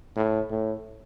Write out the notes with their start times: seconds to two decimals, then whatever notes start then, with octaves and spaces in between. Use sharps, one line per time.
0.16 A2
0.50 A2